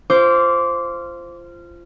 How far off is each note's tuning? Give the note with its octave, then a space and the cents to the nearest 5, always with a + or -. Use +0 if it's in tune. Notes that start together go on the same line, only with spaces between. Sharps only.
F4 -20 C5 +0 D6 -25